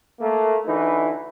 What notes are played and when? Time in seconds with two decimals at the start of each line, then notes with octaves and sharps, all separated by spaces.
0.20 A3 A#3
0.66 D2 E3 D#4 B4